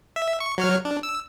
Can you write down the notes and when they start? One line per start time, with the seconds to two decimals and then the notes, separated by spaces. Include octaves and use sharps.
0.16 E5
0.40 C#6
0.58 F#3 C#5 F6
0.85 D4
1.03 E6